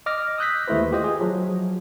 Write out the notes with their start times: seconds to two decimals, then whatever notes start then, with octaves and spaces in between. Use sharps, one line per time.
0.06 D#5 D6 F6 A#6
0.38 D#6 E6 F#6 G6 A#6 B6
0.67 D#2 G#3 A3 E4 B4 C5
0.92 F4 G4 C5 D#5
1.04 G#4
1.21 F3 F#3